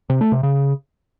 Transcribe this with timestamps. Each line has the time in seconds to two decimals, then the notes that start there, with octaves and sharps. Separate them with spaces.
0.10 C3
0.21 A3
0.32 C3
0.43 C#3